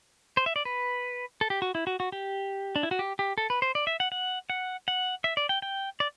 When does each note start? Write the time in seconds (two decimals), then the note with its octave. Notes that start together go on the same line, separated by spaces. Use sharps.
0.37 C5
0.46 E5
0.56 D5
0.65 B4
1.41 A4
1.50 G4
1.62 F#4
1.75 E4
1.87 F#4
2.00 F#4
2.12 G4
2.76 D4
2.83 E4
2.91 F#4
2.99 G4
3.19 G4
3.38 A4
3.50 B4
3.62 C5
3.75 D5
3.87 E5
4.00 F#5
4.12 F#5
4.50 F#5
4.88 F#5
5.24 E5
5.37 D5
5.49 G5
5.62 G5
6.00 D5